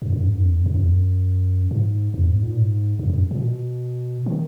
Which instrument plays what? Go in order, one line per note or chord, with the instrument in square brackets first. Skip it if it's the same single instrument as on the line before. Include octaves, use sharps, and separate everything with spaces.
[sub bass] F#2
F#2
G#2
F#2
E2
F#2
F#2
E2
F#2
G#2
E2
G#2
A#2
G#2
F#2
F#2
A#2
B2
D#3